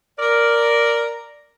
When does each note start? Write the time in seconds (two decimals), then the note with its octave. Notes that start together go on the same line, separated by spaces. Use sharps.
0.18 A#4 D5